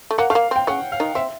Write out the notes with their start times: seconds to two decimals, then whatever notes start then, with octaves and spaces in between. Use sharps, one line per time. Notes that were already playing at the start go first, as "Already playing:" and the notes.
0.11 A3
0.18 A#3 F#5
0.30 A3 F5
0.35 A#3
0.51 C4 G5
0.67 C#3 C#4 F#5
0.92 F5
1.00 D#3 D#4
1.15 C4 E5